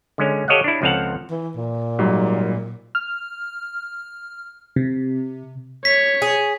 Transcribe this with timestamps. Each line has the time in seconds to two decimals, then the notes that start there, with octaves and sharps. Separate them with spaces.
0.18 D3 G#3 C#4
0.48 G4 A4 C#5 D#5 F5 F#5
0.64 D4 E4
0.82 C#2 F3 C4 A4 F5 F#5
1.30 E3
1.55 A#2
1.99 G#2 F#3 G3
2.95 F6
4.76 C3
5.85 C#5 B6
6.22 G#4